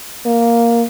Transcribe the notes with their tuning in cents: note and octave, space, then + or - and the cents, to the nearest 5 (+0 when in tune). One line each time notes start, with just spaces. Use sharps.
A#3 +0